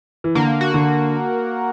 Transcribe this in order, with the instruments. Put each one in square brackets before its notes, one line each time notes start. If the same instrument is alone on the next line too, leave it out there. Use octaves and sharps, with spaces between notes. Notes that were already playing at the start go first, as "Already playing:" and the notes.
[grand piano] E3
[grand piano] D3 [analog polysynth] A#3
[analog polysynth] F#4
[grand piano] D3